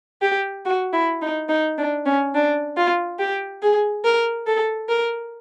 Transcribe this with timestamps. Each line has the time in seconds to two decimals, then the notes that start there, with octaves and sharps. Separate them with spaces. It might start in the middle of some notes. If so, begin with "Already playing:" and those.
0.22 G4
0.65 F#4
0.93 E4
1.22 D#4
1.49 D#4
1.78 D4
2.06 C#4
2.35 D4
2.77 F4
3.19 G4
3.62 G#4
4.05 A#4
4.47 A4
4.89 A#4